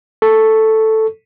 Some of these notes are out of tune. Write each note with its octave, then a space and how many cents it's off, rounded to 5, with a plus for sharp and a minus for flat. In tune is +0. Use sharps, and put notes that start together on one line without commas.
A4 +0 C#6 +0